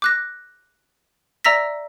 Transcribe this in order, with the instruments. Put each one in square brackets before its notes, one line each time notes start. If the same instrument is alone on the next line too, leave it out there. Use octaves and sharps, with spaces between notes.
[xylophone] D6 F#6 A#6
D5 E5 A#5 E6 A#6 B6